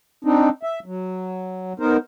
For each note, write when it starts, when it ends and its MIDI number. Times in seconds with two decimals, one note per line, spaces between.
0.25 0.49 60
0.25 0.49 62
0.25 0.49 63
0.63 0.79 76
0.86 1.73 54
1.80 1.97 59
1.80 1.97 63
1.80 1.97 70
1.80 1.97 72